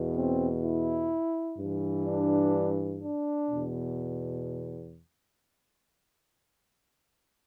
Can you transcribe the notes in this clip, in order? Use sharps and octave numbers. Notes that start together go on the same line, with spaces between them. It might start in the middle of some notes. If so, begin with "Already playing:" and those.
Already playing: E2 B2
C4
E4
G2 E3
D4
D4
E2 B2